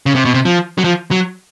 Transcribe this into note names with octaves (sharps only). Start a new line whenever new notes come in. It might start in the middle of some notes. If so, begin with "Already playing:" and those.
C#3
C3
B2
C3
F3
F#3
F3
F#3